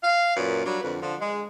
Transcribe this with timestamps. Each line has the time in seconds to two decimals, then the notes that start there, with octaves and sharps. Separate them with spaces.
0.03 F5
0.37 F#2 A#2 B4
0.65 F#3 G3 D4
0.81 F2 D3 B4
1.01 D3 F3
1.20 G#3